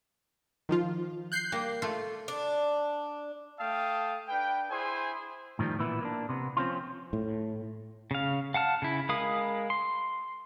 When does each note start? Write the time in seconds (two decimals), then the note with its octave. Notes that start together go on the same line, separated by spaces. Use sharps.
0.69 D#3 F3 F4
1.32 F#6 G6 C7
1.52 G3 A#3
1.82 A3 F4
2.28 D4
3.60 A3 F5 G5 A5 D#6
4.28 D4 B4 G5
4.71 E4 G#4 C5 G#5 C6
5.59 A2 D#3 F3 G3
5.79 A#2 E3 B3 E4
6.01 A#3 B3 D4
6.29 C3 B3
6.57 F3 C4 C#4 F4
7.13 A2
8.11 C#3 F5
8.54 F5 F#5 A5 F6
8.82 C#3 E4
9.09 G#3 A#4 F5 B5 D#6
9.70 C6